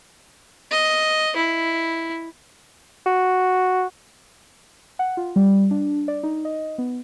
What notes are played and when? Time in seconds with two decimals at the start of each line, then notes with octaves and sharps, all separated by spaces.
0.71 D#5
1.36 E4
3.06 F#4
4.99 F#5
5.17 F4
5.36 G3
5.71 D4
6.08 D5
6.23 D#4
6.45 D#5
6.78 B3